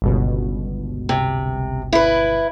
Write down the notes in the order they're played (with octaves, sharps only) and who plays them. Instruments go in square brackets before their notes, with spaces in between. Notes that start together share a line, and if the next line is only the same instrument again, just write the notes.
[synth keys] G1 C#2 B2
[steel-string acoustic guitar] C3
E4 B4